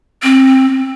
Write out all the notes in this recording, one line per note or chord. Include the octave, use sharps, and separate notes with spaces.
C4